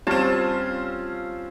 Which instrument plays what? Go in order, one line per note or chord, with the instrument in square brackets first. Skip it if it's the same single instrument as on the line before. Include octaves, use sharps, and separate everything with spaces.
[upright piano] G3 C4 [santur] C#4 F4 A5